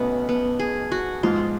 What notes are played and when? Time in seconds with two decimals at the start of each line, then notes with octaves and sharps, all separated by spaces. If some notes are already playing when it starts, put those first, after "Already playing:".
Already playing: B1 B2 A3 B3 C#4
0.29 B3
0.59 G#4
0.92 F#4
1.23 G#2 F3 G#3 F4